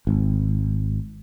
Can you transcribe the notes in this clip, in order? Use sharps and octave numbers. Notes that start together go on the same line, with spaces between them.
G#1